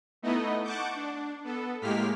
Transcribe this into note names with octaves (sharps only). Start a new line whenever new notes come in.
A3 B3 D#4 E4 D#5
F#5 A5 C#6 D6 G6
D4
B3 A4
A2 G#3 A#3 G4 F6 B6